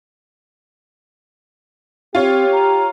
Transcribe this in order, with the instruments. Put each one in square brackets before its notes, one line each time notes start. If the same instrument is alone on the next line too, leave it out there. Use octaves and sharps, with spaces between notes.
[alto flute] C4 [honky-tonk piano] F4 C#5 [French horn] G4
[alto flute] A#5